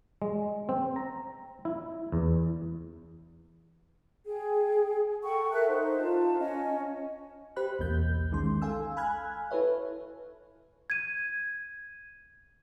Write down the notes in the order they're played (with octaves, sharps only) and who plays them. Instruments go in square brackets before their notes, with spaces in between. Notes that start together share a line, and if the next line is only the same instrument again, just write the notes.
[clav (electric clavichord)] G#3
C4
A#5
E4
E2
[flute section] G#4 G5
A4 F#5 G5 C#6
A4 A#4 E5 F#6
D#4 C5
F4 A5
C#4 D#5
[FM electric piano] G4 C5 B5 F#6
B1 E2 A#3 G6
D#3 G#3 C#4 C6
A4 F5 G#5 E6
G#5 B5 F6 F#6 G#6
E4 A4 B4 C#5 E5
[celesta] G#6 D#7